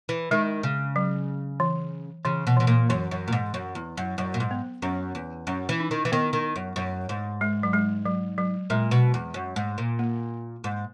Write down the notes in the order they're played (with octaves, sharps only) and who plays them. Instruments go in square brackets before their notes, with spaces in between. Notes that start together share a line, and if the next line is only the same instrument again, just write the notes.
[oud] E3
[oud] D#3 [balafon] G#3
[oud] C#3
[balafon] F#3
E3
[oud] C#3 [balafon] E3
[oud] B2
[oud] B2 [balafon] E3
[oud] A#2
[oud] F#2 [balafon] E3
[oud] F#2
A#2
G#2
F#2
E2
F#2
[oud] F#2 [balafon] F#3
[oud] A#2
G#2
[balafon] B3
[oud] F#2 [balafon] C#4
[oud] E2
[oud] F#2 [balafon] C#4
[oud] E3
[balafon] D#4
[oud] D#3
E3
[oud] D#3 [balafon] B3
[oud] D#3
F#2
F#2
G#2
[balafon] G#3
F#3
G#3
F#3
F#3
[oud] A#2 [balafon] G#3
[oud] B2
E2
F#2
G#2
A#2
[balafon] A#3
[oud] G#2